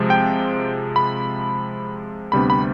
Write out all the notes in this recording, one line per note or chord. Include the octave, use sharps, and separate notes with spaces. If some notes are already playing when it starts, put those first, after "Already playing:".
Already playing: C3 F3 G#3
G5
B5
D2 C3 G3 B3 D4 B5
B5